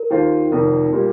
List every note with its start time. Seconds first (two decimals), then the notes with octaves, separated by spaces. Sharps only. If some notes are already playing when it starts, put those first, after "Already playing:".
Already playing: A#4
0.10 D#2 D#3 A#3 F4 C5
0.52 F1 F2 D#3 A#4
0.93 A#2 G3 A#3 G4